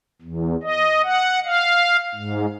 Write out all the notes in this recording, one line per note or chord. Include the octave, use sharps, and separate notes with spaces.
E2
D#5
F#5
F5
G#2